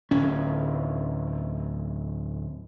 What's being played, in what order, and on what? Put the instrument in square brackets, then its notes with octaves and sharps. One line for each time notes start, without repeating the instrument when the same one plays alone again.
[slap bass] D1 C#4